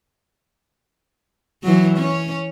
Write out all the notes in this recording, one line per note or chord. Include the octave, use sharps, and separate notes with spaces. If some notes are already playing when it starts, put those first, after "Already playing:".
E3 F#3
C#4 C#5